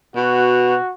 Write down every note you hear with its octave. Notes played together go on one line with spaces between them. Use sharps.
B2 F#4